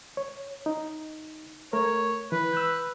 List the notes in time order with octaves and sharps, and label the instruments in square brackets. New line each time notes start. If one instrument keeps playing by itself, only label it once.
[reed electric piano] C#5
D#4
[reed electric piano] A3 A#4 [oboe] C#5
[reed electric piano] E3 [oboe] B4
[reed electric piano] E6 F#6 G6